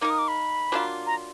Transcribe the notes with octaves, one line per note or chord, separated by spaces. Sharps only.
A#3 D#4 A#4 D6
D#6
D6
B5
F#3 A#3 D4 F4
A#5